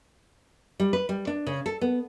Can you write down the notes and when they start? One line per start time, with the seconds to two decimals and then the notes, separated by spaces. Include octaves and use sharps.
0.80 G3
0.93 B4
1.09 G3
1.27 D4
1.47 C#3
1.66 A4
1.81 B3